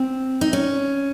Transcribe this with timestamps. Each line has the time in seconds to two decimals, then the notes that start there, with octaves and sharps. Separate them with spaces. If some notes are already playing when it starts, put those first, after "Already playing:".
Already playing: C4
0.41 D#4
0.53 C#4